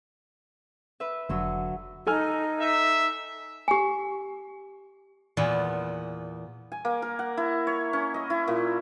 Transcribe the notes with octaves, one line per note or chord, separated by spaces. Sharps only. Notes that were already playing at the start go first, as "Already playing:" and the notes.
B4 E5
F1 D3 F#3 E6
D#4 A4 G#5 F6
E5
G4 G#5
E2 A#2 B3
G#5
A#3
A#4
F#5
E4
C#5
C#4
D#5
E4
A#2